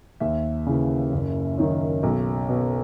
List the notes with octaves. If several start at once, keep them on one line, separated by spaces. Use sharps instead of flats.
D#2 E5
C#3 E3
F#1
F#2 D#3
B1
B2